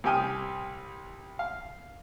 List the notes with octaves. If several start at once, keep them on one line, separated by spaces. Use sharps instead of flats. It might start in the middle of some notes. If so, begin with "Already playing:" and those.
C2 G4 G5 G#5 D#6 F6
F5